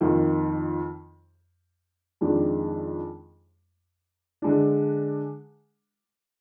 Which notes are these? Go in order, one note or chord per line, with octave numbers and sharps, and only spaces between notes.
F2 D#3 A#3
F2 D#3 G#3 D4
D3 G#3 D4